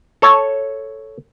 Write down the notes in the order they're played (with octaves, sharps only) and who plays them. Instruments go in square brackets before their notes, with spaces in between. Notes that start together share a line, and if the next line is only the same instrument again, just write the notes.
[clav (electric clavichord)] A4 C#5 A5